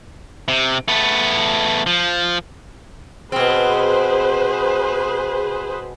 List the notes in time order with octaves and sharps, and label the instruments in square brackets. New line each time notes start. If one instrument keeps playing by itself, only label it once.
[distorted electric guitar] C3
A3 B3
F3
[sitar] B2 C4 [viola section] G#4 B4 C5